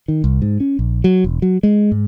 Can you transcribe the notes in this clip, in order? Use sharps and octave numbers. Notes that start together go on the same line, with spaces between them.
D#3
C2
G#2
C#4
A#1
F#3
E1
F#3
G#3
G#2